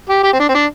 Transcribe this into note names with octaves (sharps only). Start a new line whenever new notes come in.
G4
G4
C4
D4
C4
D4